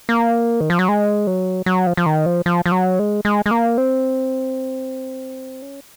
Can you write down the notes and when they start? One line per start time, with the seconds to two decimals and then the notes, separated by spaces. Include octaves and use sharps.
0.09 A#3
0.61 D#3
0.70 F3
0.79 F#3
0.89 G#3
1.27 F#3
1.66 F#3
1.87 F3
1.97 F3
2.06 D#3
2.26 F3
2.46 F3
2.66 F3
2.72 F#3
2.99 G#3
3.25 G#3
3.46 G#3
3.51 A#3
3.78 C4
5.62 C#4